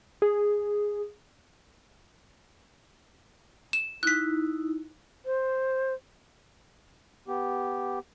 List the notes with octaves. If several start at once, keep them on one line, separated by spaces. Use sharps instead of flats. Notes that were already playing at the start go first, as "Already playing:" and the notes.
G#4
E7
D#4 E4 F#6 B6
C5
B3 G4